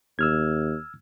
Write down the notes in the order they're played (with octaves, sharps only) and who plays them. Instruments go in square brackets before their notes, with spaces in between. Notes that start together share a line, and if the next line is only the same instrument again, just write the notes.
[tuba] D#2 [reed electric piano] E6 F6 G#6